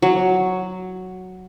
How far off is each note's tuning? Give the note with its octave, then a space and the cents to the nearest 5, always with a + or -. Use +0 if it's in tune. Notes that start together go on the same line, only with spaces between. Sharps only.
F#3 +0